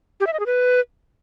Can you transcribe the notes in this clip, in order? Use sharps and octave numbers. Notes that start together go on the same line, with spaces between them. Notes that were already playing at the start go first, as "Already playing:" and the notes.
G4
E5
D#5
G#4
B4